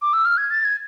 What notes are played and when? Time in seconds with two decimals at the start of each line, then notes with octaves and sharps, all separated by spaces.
0.02 D6
0.13 E6
0.25 F6
0.38 G#6
0.51 A6
0.65 G#6